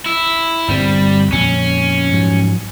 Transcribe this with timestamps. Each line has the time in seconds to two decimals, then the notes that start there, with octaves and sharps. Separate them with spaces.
0.06 E4
0.68 G1 A#2 G3 C4
1.32 F2 A#2 C#4
2.13 G#2 F3 F#3